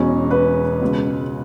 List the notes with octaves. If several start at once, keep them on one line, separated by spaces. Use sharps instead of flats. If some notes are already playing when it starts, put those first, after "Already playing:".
Already playing: E1 E2 B2 C#4
B4
C#2 B2